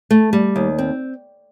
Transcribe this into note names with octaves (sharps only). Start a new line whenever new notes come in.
A3
G3
D#2
C4